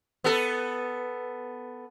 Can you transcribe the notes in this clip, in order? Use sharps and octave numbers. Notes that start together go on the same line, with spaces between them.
B3 A4